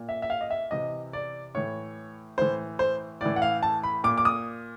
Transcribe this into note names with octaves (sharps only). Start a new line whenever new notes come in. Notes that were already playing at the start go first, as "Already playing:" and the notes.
Already playing: A#2
E5
E5
F5
D#5
E5
C3 E3 D#5
D5
A2 E3 C#5
A2 E3 C5
C5
A2 E3 D5
F#5
F5
A5
B5
A#2 D6
D6
D#6